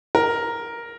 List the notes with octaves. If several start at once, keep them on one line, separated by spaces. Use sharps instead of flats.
A#4